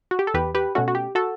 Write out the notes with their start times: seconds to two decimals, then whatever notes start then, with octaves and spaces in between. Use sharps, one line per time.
0.11 F#4
0.19 G4
0.27 A4
0.34 E2 G4 B4
0.55 G4 B4
0.75 B2 A3 C#4 F#4
0.88 F#4
0.95 G4
1.15 F#4 A4